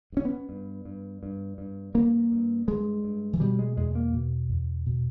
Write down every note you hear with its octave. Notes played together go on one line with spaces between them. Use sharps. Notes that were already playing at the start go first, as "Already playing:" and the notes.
G2
C#4
B3
G2
G2
G2
G2
G2 A#3
G2
G2 G#3
G2
E3
B2 G3
G#3
E2 G#3
A#3
B2
E2
B2